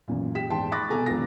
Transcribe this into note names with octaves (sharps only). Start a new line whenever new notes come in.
A1 F#2 A#2
G4 G5 B6 E7
E2 G#2 G5 A5 C6
B5 C#6 D6 F#6 A6 A#6
C2 B2 A4 G#5 A#5
A#1 D#2 G#3 B3 F4 A#6